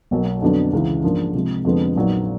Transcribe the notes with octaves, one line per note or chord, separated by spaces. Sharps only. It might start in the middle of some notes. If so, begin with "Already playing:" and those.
B1 B2 F#3 A#3
F2 D3 F#3 B3 D4
C#2 C#3 E3
G#2 F3 A#3 D4
C3 F3 G#3
F2 D3 F3 G#3 B3
A#1 A#2 F#3 B3 D#4